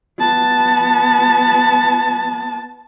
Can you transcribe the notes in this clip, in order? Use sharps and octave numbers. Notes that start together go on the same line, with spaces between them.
B3 A5